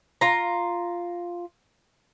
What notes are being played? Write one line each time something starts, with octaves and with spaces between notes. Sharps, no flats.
F4 A#5